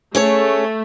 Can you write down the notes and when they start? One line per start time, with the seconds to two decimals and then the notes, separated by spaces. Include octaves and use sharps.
0.15 A3 C#4 G#4 C#5